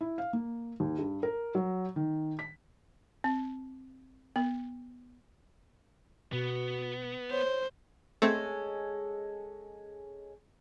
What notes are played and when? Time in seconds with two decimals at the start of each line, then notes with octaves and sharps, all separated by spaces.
0.01 E4
0.18 F5
0.33 A#3
0.80 D#2
0.98 G2
1.23 A#4
1.55 F#3
1.96 D#3
2.39 B6
3.24 C4
4.36 B3
6.33 B2 B3 F#4
7.31 C5 C#5
8.22 G#3 A3 C4 C#4 A4